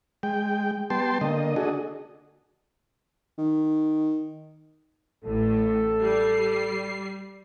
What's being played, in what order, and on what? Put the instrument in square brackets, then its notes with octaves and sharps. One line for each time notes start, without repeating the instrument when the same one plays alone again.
[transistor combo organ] G#3 G5
G3 B3 G5 A5 C6
D3 A#3 D#5
D4 F#4 G#4 A4 D#5
[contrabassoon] D#3
[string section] A1 A2 [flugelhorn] A4
[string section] G3 C7